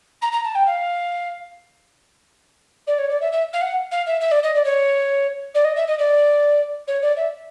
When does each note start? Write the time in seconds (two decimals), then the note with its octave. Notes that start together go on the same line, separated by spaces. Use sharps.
0.21 A#5
0.32 A#5
0.44 A5
0.55 G5
0.66 F5
2.87 D5
2.98 C#5
3.09 D5
3.21 E5
3.32 E5
3.53 F5
3.61 F#5
3.91 F5
4.06 E5
4.20 E5
4.31 D5
4.43 D#5
4.54 D5
4.64 C#5
5.54 D5
5.64 D#5
5.76 E5
5.87 D#5
5.98 D5
6.87 C#5
7.02 D5
7.16 E5